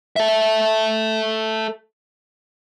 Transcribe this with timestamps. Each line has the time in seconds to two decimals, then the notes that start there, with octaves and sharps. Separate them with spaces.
0.16 A4 E5